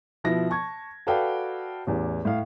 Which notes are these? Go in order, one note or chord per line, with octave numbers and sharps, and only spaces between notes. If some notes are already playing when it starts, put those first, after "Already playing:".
B2 F3 E4 A#6
A5 C#6 G#6
F#4 A4 B4 D5 F5 G5
A1 E2
A2 F5